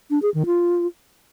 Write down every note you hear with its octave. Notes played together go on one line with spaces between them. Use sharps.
D4
G#4
D#3
F4